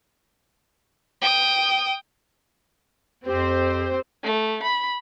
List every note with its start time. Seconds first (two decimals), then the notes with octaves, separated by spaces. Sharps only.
1.22 G5 D#6
3.26 F2 C4 G4 C5
4.24 A3
4.63 B5